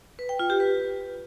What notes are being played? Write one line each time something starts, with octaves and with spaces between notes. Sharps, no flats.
B4
G5
F4
G4
B4